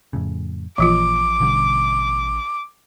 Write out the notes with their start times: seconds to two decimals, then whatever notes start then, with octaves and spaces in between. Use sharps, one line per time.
0.13 F2 A2 C#3
0.78 A1 A#2 E3 F3 F4 D6
1.40 B2 D3 G3